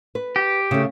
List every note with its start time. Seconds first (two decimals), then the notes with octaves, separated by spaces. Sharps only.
0.15 B4
0.36 G4
0.71 C#3 A3